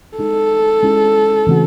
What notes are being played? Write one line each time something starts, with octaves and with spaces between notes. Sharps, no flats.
G#3 D#4 G#4 A4
G#3 C#4 E4 G#4
C#3 E3 A3 C4 F#4